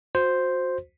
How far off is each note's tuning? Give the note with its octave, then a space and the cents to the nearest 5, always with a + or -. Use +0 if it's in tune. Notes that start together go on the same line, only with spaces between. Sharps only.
F#4 -25 C5 +0